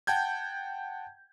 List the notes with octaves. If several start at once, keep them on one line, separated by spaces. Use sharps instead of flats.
F#5 G5 A5 G6 G#6